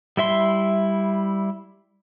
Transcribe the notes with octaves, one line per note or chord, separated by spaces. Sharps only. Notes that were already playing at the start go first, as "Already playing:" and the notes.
G3 E4 E5 C6